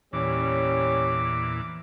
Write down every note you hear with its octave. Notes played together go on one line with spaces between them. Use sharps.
E2 A#2 E3 G3 C#4 D6